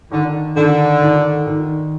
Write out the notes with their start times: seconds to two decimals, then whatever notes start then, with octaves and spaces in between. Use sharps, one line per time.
0.11 D3 D#3
0.57 D3 D#3
1.02 D#3
1.47 D#3